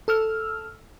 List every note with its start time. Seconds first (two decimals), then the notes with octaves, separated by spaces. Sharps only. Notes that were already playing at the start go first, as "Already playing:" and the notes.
0.08 A4 E6 F6